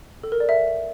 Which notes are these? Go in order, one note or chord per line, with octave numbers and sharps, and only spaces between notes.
A4
A#4
D5
E5